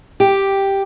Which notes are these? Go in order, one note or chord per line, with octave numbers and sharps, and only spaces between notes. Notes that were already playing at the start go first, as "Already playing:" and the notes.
G4